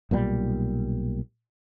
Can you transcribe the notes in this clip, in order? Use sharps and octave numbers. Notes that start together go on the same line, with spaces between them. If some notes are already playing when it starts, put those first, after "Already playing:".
B1 A#2 C#3 G3